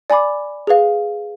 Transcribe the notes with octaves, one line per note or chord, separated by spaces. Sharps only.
D5 G#5 B5 D6
G#4 B4 F5